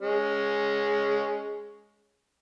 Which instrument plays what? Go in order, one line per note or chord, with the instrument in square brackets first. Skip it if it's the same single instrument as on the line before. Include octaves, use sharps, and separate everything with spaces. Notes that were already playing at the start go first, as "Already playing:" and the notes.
[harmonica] G#3 C#4